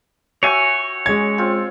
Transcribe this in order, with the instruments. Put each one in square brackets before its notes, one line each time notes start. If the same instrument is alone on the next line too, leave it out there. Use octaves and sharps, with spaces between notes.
[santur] F#4 E5 G5 [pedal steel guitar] C#5 G#5
[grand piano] G#3 G#6 [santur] C#4
[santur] C4 F4 C5